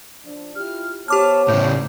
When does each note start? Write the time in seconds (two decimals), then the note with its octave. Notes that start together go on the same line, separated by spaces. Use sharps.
0.25 F3 D4
0.56 E4 F4 G4 F6
1.08 B3 G4 C5 C#5 A5 D6 F6
1.48 A2 C#3 G6